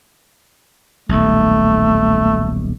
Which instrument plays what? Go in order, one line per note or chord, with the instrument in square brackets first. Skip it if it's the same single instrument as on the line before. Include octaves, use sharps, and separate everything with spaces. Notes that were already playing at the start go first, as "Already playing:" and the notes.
[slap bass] D#1 B1 [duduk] A3